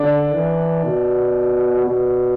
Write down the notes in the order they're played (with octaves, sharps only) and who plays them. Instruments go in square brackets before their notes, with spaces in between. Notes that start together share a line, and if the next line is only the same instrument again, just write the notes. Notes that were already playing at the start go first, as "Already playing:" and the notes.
Already playing: [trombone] D3 [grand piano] D4
[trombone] E3
B2
B2